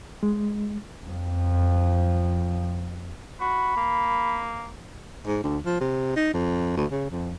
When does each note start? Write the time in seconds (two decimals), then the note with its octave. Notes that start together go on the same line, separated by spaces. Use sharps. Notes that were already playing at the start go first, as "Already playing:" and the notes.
0.23 G#3
1.08 F2 F3
3.41 F#4 B5
3.76 A#3
5.27 G#2
5.43 D2
5.65 F3
5.80 C3
6.16 D#4
6.34 F2
6.77 D2
6.91 C#3
7.10 F2